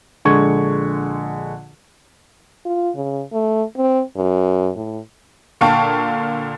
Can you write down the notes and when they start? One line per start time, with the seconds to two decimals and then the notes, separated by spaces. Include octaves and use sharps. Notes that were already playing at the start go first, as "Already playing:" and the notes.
0.25 A#1 D3 G#3 C#6 G#6
2.65 F4
2.96 C#3
3.33 A3
3.77 C4
4.17 F#2
4.76 A2
5.61 A#2 D3 F5 G5 A5 C#6